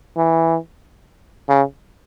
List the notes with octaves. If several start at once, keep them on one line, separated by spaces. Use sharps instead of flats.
E3
C#3